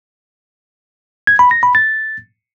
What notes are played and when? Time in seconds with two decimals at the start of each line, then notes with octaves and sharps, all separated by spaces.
1.27 G#6
1.39 B5
1.51 A#6
1.63 B5
1.75 A6